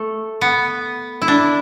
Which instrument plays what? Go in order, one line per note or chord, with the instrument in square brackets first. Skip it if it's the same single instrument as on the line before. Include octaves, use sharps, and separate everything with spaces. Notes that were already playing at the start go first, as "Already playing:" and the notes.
Already playing: [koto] A3
B3
E4
D4